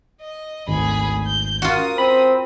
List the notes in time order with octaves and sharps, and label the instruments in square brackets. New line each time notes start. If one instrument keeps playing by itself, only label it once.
[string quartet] D#5
[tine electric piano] G#1 [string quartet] D2 G#4 B5
[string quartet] G6
[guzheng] F4 F#4 [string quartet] A#4 D#6
[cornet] C4 [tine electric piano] B5